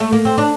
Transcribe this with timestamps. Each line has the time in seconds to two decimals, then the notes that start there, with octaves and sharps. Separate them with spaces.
0.00 A3
0.13 A#3
0.25 C4
0.38 D4